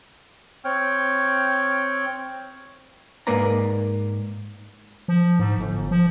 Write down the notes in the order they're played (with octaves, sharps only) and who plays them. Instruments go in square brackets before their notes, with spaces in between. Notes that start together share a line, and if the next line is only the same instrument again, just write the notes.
[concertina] C4 C#5 G5 F6
[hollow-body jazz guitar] G#2 A#3 A#4 B4 D5 A#5
[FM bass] F3
G#2
G1
F3